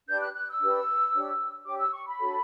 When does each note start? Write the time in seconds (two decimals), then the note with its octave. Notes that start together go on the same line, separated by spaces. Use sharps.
0.08 D4 G4 B4 G6
0.21 F#6
0.34 F#6
0.48 E6
0.60 D4 G4 B4
1.14 D4 G4 C#5
1.66 D4 G4 C#5 D6
1.79 E6
1.92 C#6
2.05 B5
2.18 D4 F#4 A4 C#5